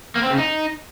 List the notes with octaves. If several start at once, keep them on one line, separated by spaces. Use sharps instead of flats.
A#3
C4
C#3
D#4